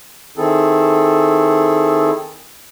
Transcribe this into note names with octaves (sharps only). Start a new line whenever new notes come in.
D#3 C4 E4 G#4 A4